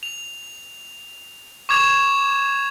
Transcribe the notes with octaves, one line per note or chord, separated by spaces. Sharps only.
F7
C#6 D6 G#6 E7 F7